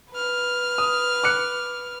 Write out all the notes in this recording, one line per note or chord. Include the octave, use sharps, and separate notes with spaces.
B4 F6
D#6
D6 F#6 C#7